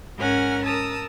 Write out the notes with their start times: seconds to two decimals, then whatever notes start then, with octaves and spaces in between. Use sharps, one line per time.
0.19 G#2 C#4 A#4 F#5 G#5 F6
0.63 A#4 A5 D#6 E6